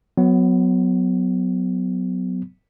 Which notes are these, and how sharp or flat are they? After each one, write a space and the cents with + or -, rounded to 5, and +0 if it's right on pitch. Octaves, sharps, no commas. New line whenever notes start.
F#3 -5 B3 +20